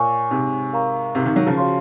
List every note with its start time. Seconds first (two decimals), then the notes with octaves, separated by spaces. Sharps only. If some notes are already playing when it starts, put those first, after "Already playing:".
Already playing: A#2 C#5 G#5 C#6
0.31 G#2 C3
0.73 A#4 F5 A#5 C#6
1.15 G#2 C3
1.25 C3 D#3
1.36 D#3 F#3
1.46 C#3 F3
1.57 F#4 C#5 F5 C6